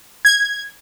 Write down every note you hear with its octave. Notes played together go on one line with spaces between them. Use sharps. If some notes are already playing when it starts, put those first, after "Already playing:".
G#6